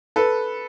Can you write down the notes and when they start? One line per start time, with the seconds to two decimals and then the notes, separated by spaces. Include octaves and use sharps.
0.16 A4 B4